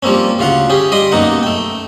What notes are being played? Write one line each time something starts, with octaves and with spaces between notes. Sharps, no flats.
F3 G3 A#3 C4 C#4
D2 C#3 F4 F5 F#5
C#4 G4 G#4
G3 D#5 B5 C6 D6 D#6
B1 F#2 A#3 D#4 F#5
A3 G5